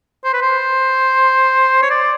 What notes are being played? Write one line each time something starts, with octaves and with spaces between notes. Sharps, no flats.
C5
B4
C5
C#5
D5